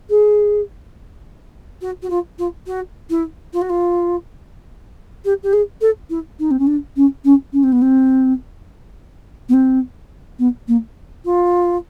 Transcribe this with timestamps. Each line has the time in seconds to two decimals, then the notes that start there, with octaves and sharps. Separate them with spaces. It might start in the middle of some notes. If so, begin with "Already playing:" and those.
0.09 G#4
1.81 F#4
2.02 F#4
2.10 F4
2.38 F4
2.66 F#4
3.10 E4
3.53 F4
3.61 F#4
3.69 F4
5.24 G4
5.43 G4
5.53 G#4
5.81 A4
6.10 E4
6.39 D#4
6.50 C4
6.59 C#4
6.67 D4
6.96 C#4
7.24 C#4
7.52 C#4
7.63 C4
7.72 B3
7.81 C4
9.49 B3
9.53 C4
10.39 B3
10.68 A#3
11.25 F4